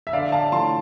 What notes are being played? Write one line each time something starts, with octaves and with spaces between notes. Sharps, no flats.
E5
D3 D5 F5
F5 A5
F3 A3 E4 A5 C6